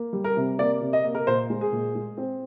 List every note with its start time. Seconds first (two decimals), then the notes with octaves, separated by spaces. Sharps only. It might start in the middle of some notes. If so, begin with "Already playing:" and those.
Already playing: A#3
0.13 G3
0.24 A#4
0.37 C3
0.59 A#3 D5
0.81 C3
0.93 D#5
1.04 A#3
1.15 A#4
1.27 A#2 C5
1.50 G#3
1.61 G#4
1.72 A#2
1.95 G#3
2.17 C4